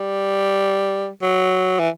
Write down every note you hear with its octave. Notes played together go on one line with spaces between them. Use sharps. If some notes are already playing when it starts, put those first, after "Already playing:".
Already playing: G3
F#3
E3